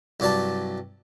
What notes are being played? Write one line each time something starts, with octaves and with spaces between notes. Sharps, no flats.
C2 G2 F#3 D5 A5